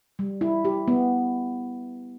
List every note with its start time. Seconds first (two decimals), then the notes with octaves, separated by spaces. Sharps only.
0.19 G3
0.41 E4
0.65 G4
0.88 B3